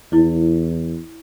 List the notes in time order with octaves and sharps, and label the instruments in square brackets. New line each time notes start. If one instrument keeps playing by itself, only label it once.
[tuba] E2 [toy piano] E4 D5